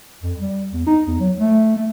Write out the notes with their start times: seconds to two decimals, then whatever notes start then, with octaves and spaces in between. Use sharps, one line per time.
0.22 F2
0.39 G3
0.72 E2
0.87 D#4
1.07 E2
1.20 F#3
1.38 A3
1.76 A3